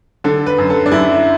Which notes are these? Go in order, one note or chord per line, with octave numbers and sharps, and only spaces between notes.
D3 A4
B4
F#2
A4
D4
F#2 E4